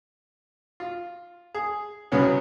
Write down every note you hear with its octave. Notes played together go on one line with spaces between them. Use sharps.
F4
G#4
C2 C#3 B3 C#4 F#4